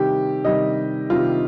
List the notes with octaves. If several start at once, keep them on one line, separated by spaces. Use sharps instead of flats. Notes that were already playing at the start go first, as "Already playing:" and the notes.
Already playing: C3 D#3 G3 G4
C3 D#3 G3 D#5
C3 D#3 G3 F4